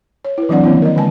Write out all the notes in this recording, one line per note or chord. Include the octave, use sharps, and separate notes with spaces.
C#5
E4 B4
E3 F#3 C4 D4 D5 F#5
D#3 F3 A#3 C4 C#4 E4
A#4 D#5
D3 G#3 G#5 A5